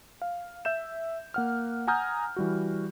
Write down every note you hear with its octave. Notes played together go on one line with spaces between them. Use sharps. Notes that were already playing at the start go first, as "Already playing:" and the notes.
F5
E5 G6 E7
A#3 F#5 F6
F#5 G#5 A#5 D#6 F6 G6
E3 G3 F#4